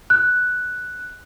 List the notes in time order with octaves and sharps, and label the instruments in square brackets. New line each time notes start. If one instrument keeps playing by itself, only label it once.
[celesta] F#6